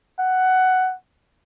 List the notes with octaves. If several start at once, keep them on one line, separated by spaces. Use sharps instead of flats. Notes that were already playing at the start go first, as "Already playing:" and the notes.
F#5